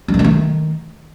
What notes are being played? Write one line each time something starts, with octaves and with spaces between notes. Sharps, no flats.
G3
G2
A3
D#3